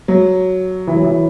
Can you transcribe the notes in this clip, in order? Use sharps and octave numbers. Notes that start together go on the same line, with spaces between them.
F#3
E3
F#3
E3